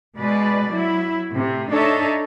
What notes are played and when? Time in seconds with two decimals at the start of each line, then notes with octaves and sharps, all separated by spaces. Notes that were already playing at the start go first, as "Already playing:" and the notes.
0.17 B2 G#3 B4 D5
0.70 F#3 E4
1.33 A2 C3
1.71 D4 D#4 A4 C#5 D#5 E5